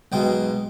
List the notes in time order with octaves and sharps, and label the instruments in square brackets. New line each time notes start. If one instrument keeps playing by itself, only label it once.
[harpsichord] B1 B2 G#3 G5